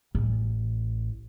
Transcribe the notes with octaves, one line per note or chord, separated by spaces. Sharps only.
A1